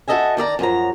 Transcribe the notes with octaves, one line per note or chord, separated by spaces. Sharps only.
F#4 G4 A4 D#5 E5 G#5
D#3 D5 E5 A#5
F#2 F3 F#3 A#5